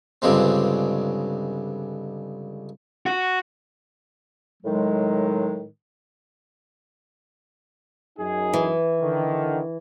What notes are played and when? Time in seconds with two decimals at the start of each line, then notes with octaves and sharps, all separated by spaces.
0.22 C#2 G2 D3 G#3 C4
3.06 F#4
4.63 A2 D#3 F#3 G#3
8.19 F#2 D#4 G#4
8.53 E3
9.01 D3 D#3